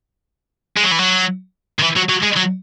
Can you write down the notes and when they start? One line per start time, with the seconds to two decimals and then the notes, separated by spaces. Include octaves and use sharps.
0.77 G#3
0.84 F#3
0.91 E3
0.99 F#3
1.80 D#3
1.83 E3
1.97 F#3
2.10 F#3
2.23 G#3
2.37 F#3